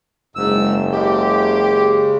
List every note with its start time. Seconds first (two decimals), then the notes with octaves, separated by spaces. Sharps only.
0.36 F#1 G#2 E6
0.93 C#3 G#3 G4